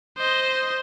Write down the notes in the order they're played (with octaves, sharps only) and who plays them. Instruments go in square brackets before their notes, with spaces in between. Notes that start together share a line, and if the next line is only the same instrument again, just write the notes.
[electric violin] C5 D#5